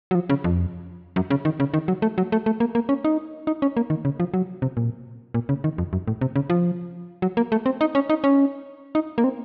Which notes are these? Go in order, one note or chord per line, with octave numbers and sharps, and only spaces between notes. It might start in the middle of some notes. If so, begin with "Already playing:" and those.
F#3
F3
C#3
F2
F#2
C#3
D#3
C#3
D#3
F#3
A3
F#3
A3
A3
A#3
A#3
C#4
D#4
D#4
C#4
A#3
D#3
C#3
F3
F#3
C3
A#2
A#2
C#3
D#3
F2
F#2
A2
C3
C#3
F3
F#3
A#3
A3
C4
D#4
C#4
D#4
C#4
D#4
A#3
C4